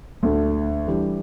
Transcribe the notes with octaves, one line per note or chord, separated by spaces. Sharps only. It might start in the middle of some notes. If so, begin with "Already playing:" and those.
D2 D3 A3
E3 G3 D4 G4